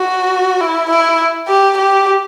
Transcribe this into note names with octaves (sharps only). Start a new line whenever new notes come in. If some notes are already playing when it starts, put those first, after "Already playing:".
Already playing: F#4
E4
E4
G4
G4